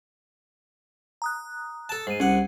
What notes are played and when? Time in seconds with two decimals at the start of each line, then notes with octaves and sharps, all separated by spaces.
1.22 A#5 D#6 F#6
1.89 A4 A5
2.07 G#2 C7 D#7
2.20 C2 C#4 F#5